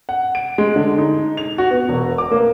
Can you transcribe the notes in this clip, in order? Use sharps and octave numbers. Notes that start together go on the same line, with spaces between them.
F#5
D7
G#3
D3
D#4
F7
F#4
B3
E1
D6
A#3